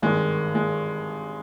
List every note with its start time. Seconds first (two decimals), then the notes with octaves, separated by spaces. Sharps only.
0.02 G#1 G2 D#3 G#3
0.55 G#3